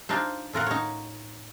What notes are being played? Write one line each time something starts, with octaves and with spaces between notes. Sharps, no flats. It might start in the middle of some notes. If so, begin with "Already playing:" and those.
D4 D#4 F4 C5
A2 F4 A#4 F#5
D#4 C#5